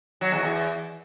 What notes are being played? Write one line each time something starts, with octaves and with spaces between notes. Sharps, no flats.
F#3
E2
E2